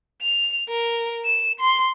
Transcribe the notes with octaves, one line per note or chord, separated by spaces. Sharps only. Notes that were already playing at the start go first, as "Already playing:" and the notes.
F7
A#4
E7
C6